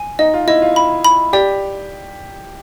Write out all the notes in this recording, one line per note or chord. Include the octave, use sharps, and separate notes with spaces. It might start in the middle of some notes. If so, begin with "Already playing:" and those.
Already playing: G#5
D#4 D#5
F4
E4 D#5
F4
B5
B5
G4 D5